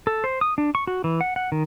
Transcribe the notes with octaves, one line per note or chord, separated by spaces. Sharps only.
A4
C5
D#6
D4
C#6
F#4
E3
F#5
F#5
D#3